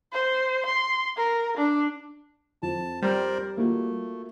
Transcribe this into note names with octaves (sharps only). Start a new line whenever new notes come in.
C5
C6
A#4
D4
F2 A5
G3 A#4 C5 D5
A3 A#3 F4 F#4